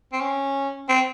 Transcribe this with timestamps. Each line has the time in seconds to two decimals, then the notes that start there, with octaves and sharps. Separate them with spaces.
0.13 C4
0.21 C#4
0.89 C4